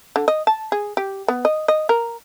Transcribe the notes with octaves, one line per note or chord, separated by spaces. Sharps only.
D3
D#5
A5
G#4
G4
B3
D#5
D#5
A#4